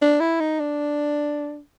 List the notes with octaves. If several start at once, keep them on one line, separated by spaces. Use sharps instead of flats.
D4
E4
D#4
D4